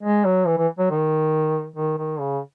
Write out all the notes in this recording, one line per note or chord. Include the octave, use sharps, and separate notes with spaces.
G#3
F#3
E3
E3
F#3
D#3
D#3
D#3
C#3